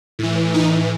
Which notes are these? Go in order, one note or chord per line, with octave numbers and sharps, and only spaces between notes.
A2 E3
D#4